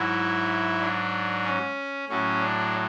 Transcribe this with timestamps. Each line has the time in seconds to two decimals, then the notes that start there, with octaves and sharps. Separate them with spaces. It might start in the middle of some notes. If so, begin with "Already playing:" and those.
Already playing: G#2 F#3 E4
0.81 D4
1.45 C#4
2.09 A2 F#3 C#4
2.41 D4